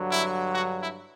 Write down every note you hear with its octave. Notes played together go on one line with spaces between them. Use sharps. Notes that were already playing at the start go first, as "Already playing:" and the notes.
Already playing: G2 D3 F#3
E4
F#4
E4